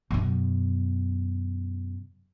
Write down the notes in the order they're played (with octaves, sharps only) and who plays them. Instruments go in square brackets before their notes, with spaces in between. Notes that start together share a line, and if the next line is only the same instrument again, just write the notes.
[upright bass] F#2 B2